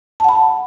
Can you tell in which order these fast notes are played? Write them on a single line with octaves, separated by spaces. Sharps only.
A5 F#5 B5